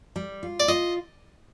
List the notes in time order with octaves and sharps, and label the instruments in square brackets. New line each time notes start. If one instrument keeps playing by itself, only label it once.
[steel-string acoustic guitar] G3
F4
[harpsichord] D5
[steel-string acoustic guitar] F4 [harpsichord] D#5